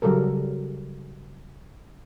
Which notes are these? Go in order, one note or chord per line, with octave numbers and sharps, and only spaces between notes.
C#3 F#3 G3 A4 A#4